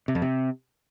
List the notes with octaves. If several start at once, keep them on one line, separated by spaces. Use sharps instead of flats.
C3
F2
C3